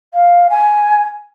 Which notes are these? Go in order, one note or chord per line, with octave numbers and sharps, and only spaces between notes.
F5
G#5